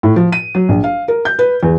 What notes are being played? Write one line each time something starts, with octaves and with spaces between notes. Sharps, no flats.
A2
F3
D#7
F#3
A#1
F5
A#4
G6
B4
E2